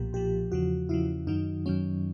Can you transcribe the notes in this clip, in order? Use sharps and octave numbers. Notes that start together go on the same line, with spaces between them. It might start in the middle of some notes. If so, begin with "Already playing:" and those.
Already playing: B1 A#2 F3 G4
B1 A#2 F3 G4
E2 C#3 F3 F#4
E2 C#3 F3 E4
F#2 D#3 F#3 D#4
F#2 D#3 F#3 C#4